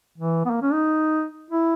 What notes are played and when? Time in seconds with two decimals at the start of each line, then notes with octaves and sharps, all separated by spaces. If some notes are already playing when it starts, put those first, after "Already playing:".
0.18 E3
0.45 B3
0.51 A#3
0.62 C#4
0.73 D#4
1.51 E4